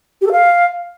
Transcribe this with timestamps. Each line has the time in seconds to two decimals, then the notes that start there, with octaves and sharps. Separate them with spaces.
0.21 G4
0.26 A4
0.32 F5